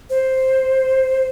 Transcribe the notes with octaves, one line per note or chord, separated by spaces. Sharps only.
C5